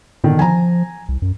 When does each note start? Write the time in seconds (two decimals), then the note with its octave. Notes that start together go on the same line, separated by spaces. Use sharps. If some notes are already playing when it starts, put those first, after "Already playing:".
0.24 B1 A2 D3 D#3
0.39 F3 G#5 A#5
1.09 C2
1.22 F#2